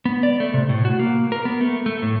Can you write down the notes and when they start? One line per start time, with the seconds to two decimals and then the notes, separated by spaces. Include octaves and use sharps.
0.05 B3
0.23 D5
0.40 A3
0.54 C3
0.69 A2
0.85 F#4
0.99 A#3
1.32 A#4
1.45 B3
1.61 A3
1.86 A3
2.02 A2